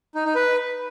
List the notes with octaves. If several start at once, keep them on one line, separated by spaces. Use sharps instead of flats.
D#4
D#4
B4